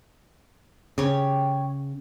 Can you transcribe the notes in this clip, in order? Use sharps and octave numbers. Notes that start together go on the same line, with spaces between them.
C#3 G4 C#5